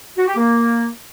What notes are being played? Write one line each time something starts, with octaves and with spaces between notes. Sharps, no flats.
F#4
G4
A#3